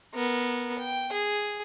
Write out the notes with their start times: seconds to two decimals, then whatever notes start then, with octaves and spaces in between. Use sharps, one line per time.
0.14 B3 A#4
0.79 G5
1.12 G#4